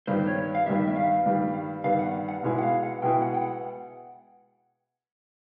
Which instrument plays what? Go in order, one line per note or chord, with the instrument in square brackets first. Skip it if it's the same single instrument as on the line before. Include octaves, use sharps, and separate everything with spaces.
[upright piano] G2 D#3 G3 B3 [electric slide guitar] C5
[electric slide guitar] C#5
F5
[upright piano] G2 D#3 G3 B3 [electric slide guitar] E5
[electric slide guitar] E5
F5
[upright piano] G2 D#3 G3 B3
[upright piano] G2 D#3 G3 B3 [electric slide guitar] F5
[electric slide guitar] F#5
F#5
[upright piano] B2 G#3 B3 E4 G#4
[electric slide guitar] F#5
F5
F#5
[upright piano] B2 G#3 B3 E4 G#4 [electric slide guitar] G5
[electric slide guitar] F#5
G5
F#5